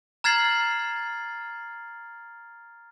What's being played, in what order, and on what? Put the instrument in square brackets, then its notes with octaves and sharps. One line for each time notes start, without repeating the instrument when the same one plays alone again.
[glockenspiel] A#5 F6 G#6 A6 C7 F#7